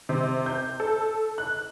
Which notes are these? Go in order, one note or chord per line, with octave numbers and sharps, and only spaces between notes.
C3
G6
A4
F#6